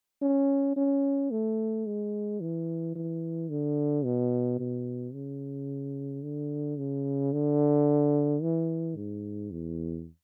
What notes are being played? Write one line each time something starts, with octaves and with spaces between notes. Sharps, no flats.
C#4
C#4
A3
G#3
E3
E3
D3
B2
B2
C#3
D3
C#3
D3
E3
G#2
E2